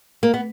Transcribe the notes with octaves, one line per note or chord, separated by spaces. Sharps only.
A#3
B3